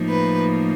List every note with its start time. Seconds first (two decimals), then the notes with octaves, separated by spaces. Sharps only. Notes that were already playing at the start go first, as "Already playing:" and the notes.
Already playing: A2 F3 A#3 D#4
0.10 B4